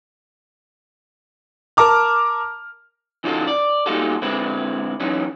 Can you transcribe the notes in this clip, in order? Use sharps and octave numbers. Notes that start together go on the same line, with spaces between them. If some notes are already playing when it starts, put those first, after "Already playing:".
A#4 A5 A#5 D6 F6
C#3 E3 D#4 F4 F#4 A4
D5
A#2 G3 D#4 F4 F#4 A4
D3 G#3 C4 E4 B4
F#2 E3 C#4 D#4